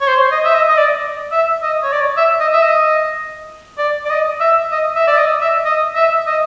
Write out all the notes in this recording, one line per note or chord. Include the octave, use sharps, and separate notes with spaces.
C#5
C5
D#5
E5
D#5
D#5
D5
E5
D#5
C#5
D5
E5
D#5
E5
D#5
D5
D5
D#5
E5
D#5
E5
D5
D#5
E5
D#5
E5
D#5